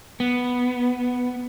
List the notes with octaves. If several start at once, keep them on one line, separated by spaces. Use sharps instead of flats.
B3